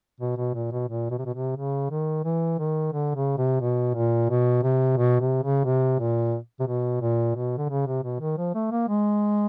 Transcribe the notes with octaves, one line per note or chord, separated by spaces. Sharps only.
B2
B2
A#2
B2
A#2
B2
C3
B2
C3
C#3
D#3
E3
D#3
D3
C#3
C3
B2
A#2
B2
C3
B2
C3
C#3
C3
A#2
C3
B2
A#2
B2
D3
C#3
C3
B2
D#3
F3
A3
A#3
G#3